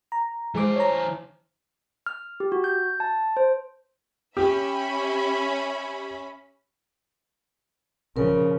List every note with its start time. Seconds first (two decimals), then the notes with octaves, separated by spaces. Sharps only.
0.12 A#5
0.55 E3 G#3 G#4 C5 D6
0.76 C#5 A#5
2.06 F6
2.40 G4
2.52 F#4
2.64 G6
3.00 A5
3.37 C5
4.37 C#4 G4 E5 B5
8.17 C#3 F3 A#4